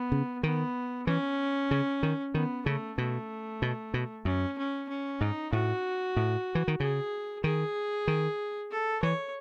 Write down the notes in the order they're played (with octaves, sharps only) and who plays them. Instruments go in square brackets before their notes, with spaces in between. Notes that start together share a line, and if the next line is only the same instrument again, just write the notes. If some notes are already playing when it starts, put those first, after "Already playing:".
Already playing: [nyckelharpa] B3
[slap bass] C#3
[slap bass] D#3 [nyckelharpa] B3
[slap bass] E3 [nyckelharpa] C#4
[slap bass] C#3
D#3
[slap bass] D#3 [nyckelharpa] B3
[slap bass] C#3 [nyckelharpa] A3
[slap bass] B2 [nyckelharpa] A3
[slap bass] B2
B2
[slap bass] F#2 [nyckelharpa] C#4
[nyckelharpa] C#4
C#4
[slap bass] G#2 [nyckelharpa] D#4
[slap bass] A2 [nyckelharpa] F#4
[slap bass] A2
E3
D#3
[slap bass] C#3 [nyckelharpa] G#4
[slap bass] D#3 [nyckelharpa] G#4
[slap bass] D#3
[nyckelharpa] A4
[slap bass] E3 [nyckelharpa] C#5